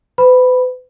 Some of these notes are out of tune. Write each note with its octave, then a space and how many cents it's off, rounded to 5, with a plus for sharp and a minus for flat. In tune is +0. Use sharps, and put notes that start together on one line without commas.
B4 +40 B5 +0